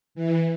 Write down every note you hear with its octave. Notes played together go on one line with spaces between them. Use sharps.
E3